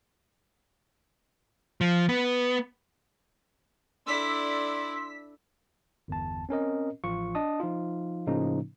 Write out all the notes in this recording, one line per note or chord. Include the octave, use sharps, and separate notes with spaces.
F3
B3
D4 E4 A4 D5 C6 E6 B6
G1 E2 A5
C4 C#4 A#4 D#5
A1 F3 F4 C#6
D4 D#5 A5 D#6
F3 D#4 F4
A2 C#3 F3 A#3 C#4 D#4